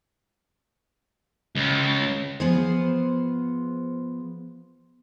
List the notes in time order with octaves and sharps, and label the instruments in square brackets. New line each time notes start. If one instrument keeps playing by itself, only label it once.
[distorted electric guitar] C#2
[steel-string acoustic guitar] F3 B3 G#4 C5